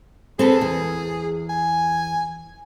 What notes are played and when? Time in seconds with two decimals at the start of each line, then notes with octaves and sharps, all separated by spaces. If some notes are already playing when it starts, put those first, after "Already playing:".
0.39 C4 G#4 A4 B4
0.61 E2
1.50 G#5